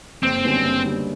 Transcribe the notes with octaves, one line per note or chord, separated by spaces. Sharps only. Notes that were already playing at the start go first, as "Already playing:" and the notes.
F#1 C4
F#2 D3 G3 B3
F#1
F#2 D3 G3 B3